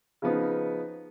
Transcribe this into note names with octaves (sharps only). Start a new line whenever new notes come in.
C#3 F3 B3 D#4